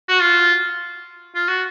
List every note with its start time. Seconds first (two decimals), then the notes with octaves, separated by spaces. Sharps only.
0.08 F#4
0.20 F4
1.35 F4
1.48 F#4